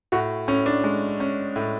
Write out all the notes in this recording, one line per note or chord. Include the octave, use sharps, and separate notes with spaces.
A2 F#4
A2 C#4
D4
G#3
C#4
A2